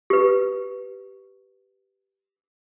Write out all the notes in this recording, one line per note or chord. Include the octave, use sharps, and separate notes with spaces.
G4 B4